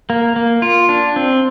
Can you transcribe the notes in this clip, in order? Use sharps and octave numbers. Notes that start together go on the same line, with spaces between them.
A#3
A#3
F4
D4
C4